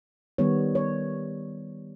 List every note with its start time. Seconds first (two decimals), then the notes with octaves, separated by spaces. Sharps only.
0.38 D#3 G3 B3 C#5
0.75 C#5